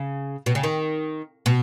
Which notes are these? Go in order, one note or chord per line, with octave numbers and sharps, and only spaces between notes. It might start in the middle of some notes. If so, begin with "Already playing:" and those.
Already playing: C#3
B2
C#3
D#3
B2